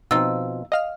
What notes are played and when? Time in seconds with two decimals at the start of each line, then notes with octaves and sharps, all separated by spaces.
0.11 B2 F3 C4 D#4 F4 E6
0.72 D#5 F5 F6